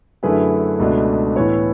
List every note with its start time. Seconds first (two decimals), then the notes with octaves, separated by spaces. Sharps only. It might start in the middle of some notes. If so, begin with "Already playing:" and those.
0.23 F#2 D3 A3 E4 G#4 B4
0.79 C#2 B2 A3 D4
1.36 A2 E3 B3 A4 C#5